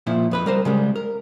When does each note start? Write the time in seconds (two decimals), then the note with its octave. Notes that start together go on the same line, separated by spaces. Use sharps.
0.07 A#2 F3 E4
0.31 F2 B4 B5
0.46 G3 A#4 C5
0.65 C#3 G3 G#3
0.96 A#4